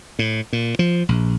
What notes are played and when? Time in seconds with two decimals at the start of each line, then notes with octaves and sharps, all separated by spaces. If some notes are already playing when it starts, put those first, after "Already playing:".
0.19 A2
0.53 A#2
0.79 F3
1.09 A#1